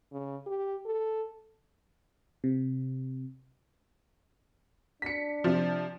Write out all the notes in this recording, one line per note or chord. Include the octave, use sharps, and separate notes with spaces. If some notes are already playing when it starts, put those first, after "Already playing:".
C#3
G4
A4
C3
D4 B6 C#7
C3 F3